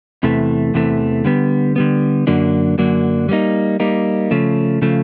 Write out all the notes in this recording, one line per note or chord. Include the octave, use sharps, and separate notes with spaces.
E2 C3 E3 A3
E2 C3 E3 A3
D3 G3 B3
D3 G3 B3
F#2 D3 F#3 A#3 D4
F#2 D3 F#3 A#3 D4
G3 A#3 D#4
G3 A#3 D#4
C#3 F3 A3
C#3 F3 A3